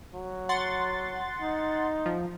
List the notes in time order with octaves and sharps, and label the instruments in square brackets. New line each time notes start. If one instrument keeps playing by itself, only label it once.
[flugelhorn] F#3
[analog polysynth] F#5 C6 A6
[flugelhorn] D#4
[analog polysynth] F3